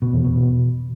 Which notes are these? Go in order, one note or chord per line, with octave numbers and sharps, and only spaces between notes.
B2
E2
B2